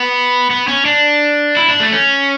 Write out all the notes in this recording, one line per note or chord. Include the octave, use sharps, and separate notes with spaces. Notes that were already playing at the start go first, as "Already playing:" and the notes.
Already playing: B3
B3
C#4
D4
E4
D4
A3
C#4